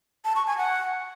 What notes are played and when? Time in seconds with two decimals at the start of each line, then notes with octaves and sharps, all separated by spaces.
0.25 A5
0.36 C#6
0.47 G#5
0.58 F#5